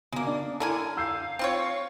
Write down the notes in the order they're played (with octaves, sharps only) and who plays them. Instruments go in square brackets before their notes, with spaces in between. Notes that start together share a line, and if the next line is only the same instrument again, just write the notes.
[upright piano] B2 [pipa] G#3 A#3
[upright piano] D4
[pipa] D3 A#4 G#5 [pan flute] E4 [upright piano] A4
[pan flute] F5 [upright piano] E6 G6 C7
[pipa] C4 F4 C#5